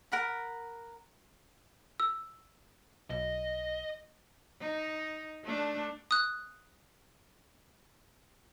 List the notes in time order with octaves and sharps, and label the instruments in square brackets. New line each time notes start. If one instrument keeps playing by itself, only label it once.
[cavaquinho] A#4 F#5 B5
[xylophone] E6
[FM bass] B1 [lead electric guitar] D#5
[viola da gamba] D#4
A3 D4
[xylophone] D#6 F#6